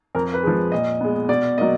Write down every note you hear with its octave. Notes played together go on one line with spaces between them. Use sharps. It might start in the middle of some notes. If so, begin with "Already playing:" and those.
F2 A#4
B4
F3 G#3
A#2 D#5
G#3 B3
B2 D5
F#3 A#3 D#5